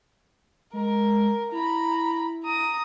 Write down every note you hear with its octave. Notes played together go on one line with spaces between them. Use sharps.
G#3 A#4
E4 A#5 B5
A#5 D#6